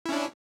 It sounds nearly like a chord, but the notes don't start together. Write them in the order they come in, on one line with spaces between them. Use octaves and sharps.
E4 C#4 D4